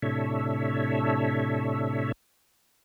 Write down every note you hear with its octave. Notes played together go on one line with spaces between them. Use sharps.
A2 C3 D4 A4 C#5 E5